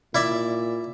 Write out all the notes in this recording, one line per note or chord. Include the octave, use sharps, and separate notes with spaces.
A#2 E4 D5 E5